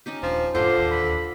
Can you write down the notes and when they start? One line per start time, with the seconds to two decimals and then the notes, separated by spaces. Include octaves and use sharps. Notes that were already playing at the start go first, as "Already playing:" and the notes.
0.06 C#4 D#4 G4
0.23 D#1 F3 D4
0.55 F2 A2 D3 D4 F4 C5
0.75 D1 D#2
0.91 B5